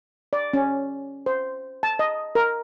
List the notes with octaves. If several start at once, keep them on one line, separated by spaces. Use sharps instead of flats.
D5
C#4
C5
A5
D#5
A#4